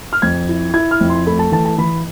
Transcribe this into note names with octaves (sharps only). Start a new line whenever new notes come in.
F6
F2 G#6
E4
E4 G#6
F6
F2
C6
A3 B5
A5
E3 A5
A5
E3 B5